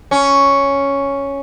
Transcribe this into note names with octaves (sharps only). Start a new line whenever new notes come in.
C#4